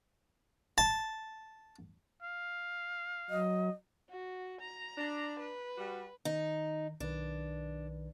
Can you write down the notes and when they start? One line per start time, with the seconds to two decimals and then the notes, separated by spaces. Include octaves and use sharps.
0.78 A5
2.22 F5
3.30 F#3 D#5
4.10 F#4
4.61 A#5
4.98 D4
5.40 B4
5.78 G3 F#4
6.25 D#3 D#4
7.00 B1 D#3 D4 B4